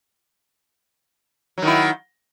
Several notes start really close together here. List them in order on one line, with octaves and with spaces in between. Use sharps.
F#3 D#3 E4